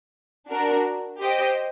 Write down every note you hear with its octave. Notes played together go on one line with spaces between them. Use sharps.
D4 F#4 A#4
G4 C5 D#5 G5